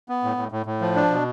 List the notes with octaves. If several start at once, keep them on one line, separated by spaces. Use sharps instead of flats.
B3
A2
A2
A2
A2
F3
D4
B2